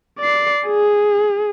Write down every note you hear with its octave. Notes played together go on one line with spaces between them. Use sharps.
D5 C7
G#4